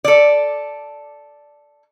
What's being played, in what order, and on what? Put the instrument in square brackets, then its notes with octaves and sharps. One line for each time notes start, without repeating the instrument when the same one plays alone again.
[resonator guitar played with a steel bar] A4 D5